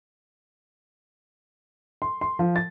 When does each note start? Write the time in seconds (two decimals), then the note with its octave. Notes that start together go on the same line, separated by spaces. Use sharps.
2.02 C6
2.21 C6
2.39 F3
2.56 A6